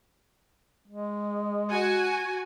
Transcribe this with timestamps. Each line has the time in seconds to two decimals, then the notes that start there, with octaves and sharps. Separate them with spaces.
0.88 G#3
1.70 F#4 G#5